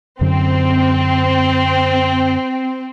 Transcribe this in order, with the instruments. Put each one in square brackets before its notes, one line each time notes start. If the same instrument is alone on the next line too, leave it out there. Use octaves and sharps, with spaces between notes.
[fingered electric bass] F#2 D3 [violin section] C4